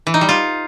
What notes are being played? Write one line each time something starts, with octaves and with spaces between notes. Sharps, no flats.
E3
D#4
G3
F4